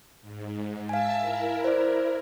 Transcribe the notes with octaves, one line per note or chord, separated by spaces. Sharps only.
G#2
E5 F5 G#5 A5 E6
E4 A#4
C5 D5